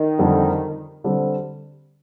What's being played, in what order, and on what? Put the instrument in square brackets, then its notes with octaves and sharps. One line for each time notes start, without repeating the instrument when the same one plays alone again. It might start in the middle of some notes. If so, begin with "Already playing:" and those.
Already playing: [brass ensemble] D#3
[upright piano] F2 D3 G3 C4
D3 G3 C4